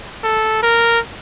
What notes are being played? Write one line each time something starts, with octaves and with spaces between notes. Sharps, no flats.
A4
A#4